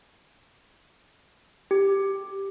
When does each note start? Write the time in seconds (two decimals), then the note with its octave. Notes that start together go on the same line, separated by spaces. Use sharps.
1.71 G4